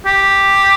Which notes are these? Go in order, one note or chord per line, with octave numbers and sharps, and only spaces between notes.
G4